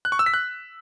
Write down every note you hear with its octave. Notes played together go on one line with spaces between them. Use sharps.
F#6
C#6
E6
B6
F#6